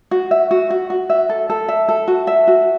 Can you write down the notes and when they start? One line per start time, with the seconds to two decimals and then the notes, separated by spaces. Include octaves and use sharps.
0.11 F#4
0.31 E5
0.51 F#4
0.70 F#4
0.90 F#4
1.10 E5
1.29 A4
1.50 A4
1.69 E5
1.89 A4
2.08 F#4
2.27 E5
2.48 F#4